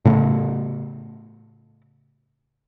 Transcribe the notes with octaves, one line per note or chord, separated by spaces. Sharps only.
A2 C#3 A3